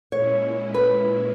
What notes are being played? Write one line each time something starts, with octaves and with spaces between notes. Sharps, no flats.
A#2 G#3 C#4 E4 C#5
B4